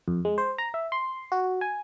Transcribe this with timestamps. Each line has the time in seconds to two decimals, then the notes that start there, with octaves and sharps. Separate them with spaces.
0.08 F2
0.25 G#3
0.38 C5
0.58 A#5
0.74 E5
0.92 C6
1.32 F#4
1.61 G#5